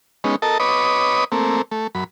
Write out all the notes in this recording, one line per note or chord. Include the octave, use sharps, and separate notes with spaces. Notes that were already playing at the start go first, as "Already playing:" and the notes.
G#3 B3 C#4 D#4
A4 A#4 D#5 A5
B4 C#5 D#5 B5 D6 D#6
A3 A#3 C4
A3
F#2 B5